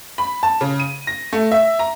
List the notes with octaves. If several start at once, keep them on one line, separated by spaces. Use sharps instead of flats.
B5
A5
C#3
D#7
A#6
A3
E5
A#5